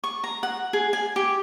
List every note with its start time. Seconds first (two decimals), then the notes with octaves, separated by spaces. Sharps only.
0.04 C#6
0.24 A#5
0.43 F#5
0.73 G#4
0.93 G#5
1.16 G4